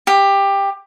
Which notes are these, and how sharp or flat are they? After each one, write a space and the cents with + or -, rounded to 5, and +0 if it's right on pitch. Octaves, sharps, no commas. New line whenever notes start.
G4 +15